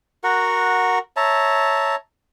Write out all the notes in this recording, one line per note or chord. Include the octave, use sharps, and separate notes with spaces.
F#4 A#4 F#5
C#5 E5 A5 A#5